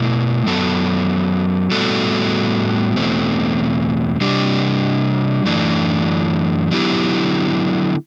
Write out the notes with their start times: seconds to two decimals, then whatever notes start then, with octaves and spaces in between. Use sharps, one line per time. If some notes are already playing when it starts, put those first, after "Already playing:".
Already playing: B2 A3 E4 A4
0.46 F#2 F#3 B3 F#4 A4
1.71 A2 G3 B3 F#4 A4
2.96 E2 B2 A3 C4
4.21 C3 G3 D4 G4
5.45 F#2 E3 A3 D4
6.71 D3 F#3 B3 E4 G4